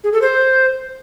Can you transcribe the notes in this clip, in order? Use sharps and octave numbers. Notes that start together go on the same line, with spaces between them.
G#4
A4
C5